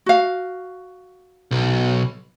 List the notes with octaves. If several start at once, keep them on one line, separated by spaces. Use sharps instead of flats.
F#4 F5
B1